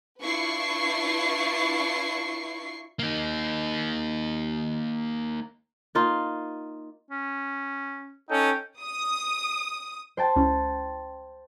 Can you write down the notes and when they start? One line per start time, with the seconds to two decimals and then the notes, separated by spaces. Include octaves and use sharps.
0.22 D4 E4 F4 B4 C#6 C7
2.99 A#3 D#4
5.95 A#3 D#4 F4
7.11 C#4
8.30 C#4 D#4 A4 G5
8.81 D#6
10.17 C5 G5 A5
10.36 C#2 C#4 E4